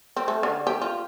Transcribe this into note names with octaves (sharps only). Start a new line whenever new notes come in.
C4
A3
D3
G4
F4